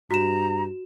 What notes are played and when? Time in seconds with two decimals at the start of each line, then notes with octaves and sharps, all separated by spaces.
0.11 G2 F#4 A#5 E7